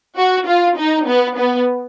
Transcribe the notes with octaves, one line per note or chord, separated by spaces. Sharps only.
F#4
F4
D#4
B3
B3